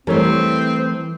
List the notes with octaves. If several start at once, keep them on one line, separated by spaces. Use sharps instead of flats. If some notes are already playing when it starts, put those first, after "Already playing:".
E3 G3 A3 C4 A#4 C#5